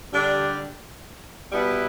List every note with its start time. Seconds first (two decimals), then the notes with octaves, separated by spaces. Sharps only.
0.14 D3 G3 D4 G4
1.52 B2 G3 B3 E4 B4